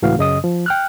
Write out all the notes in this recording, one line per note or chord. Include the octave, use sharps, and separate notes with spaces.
C#2 A2 E3 F#4 F5
F#2 C#3 D#5 D#6
F3
G5 F6 F#6